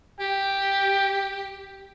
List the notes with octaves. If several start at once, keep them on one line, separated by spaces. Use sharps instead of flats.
G4 G5